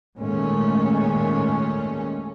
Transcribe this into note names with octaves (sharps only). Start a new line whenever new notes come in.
D#2 A#2 G#3 A3 C#4